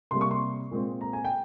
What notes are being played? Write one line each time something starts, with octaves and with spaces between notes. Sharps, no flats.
C3 G3 A#3 C6
C#6
C6
A#2 G#3 C4
A#5
G#5
G5